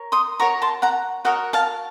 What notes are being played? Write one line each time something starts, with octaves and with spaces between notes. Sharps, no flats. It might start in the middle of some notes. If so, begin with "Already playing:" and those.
Already playing: A#4 C#5
C6 D#6
F#4 A#4 C#5 A#5 C#6
A5 C6
F#5 A#5
F#4 A#4 C#5 D#5 F#5
F5 A5